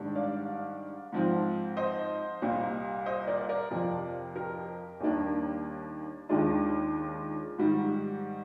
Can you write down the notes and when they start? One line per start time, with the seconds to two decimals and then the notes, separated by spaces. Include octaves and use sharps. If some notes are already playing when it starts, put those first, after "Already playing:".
Already playing: G#2 D#3 G3 D4
0.15 D5 F5
1.12 G#2 F3 C4
1.77 C5 D#5
2.42 C2 A#2 G3
3.06 C5 D#5
3.27 A#4 D5
3.49 A#4 D5
3.71 F2 C3 F3
4.35 G4 A#4
5.00 D#2 D#3 G3 A#3 D4
6.29 D#2 D#3 G#3 D4 F4
7.58 G#2 D#3 G3